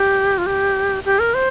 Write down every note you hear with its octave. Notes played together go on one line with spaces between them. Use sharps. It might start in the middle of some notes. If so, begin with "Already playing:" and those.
Already playing: G4
F4
G4
G4
A#4
C5